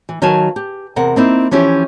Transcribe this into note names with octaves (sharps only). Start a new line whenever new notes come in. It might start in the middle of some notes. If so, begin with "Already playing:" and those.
E3
D#3 F#3 B4 F5 G#5 A5
G4
E2 C3 A#4 F#5
A#3 C4 D#4 E4
E3 F3 C#4 E4 G4